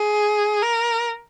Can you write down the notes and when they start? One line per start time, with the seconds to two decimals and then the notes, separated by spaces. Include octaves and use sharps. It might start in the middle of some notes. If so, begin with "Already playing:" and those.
Already playing: G#4
0.63 A#4